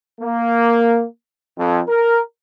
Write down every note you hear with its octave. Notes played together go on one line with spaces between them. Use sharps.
A#3
F2
A#4